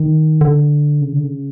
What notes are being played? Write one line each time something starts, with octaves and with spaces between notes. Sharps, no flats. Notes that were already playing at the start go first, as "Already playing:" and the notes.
Already playing: D#3
D3
C#3
D3
C#3